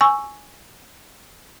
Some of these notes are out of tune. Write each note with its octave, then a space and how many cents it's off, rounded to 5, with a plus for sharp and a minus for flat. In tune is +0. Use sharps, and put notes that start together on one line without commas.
G#5 +0 C#6 +0 E6 +5